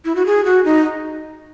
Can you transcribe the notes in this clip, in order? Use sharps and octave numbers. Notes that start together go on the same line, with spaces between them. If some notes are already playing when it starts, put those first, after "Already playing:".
E4
F#4
G#4
F#4
D#4